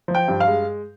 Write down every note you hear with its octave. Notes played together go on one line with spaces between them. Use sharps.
F3
G5
G2
F5
G#3